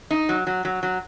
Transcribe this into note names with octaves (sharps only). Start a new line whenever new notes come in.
D#4
F#3
F#3
F#3
F#3